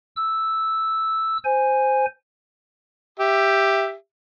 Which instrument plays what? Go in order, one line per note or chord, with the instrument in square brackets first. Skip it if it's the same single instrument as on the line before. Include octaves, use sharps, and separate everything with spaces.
[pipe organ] E6
C5 G#5
[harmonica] G4 E5